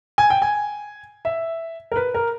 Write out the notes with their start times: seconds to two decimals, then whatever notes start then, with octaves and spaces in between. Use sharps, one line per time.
0.18 G#5
0.30 G5
0.42 G#5
1.25 E5
1.91 A#4
1.96 B4
2.14 A#4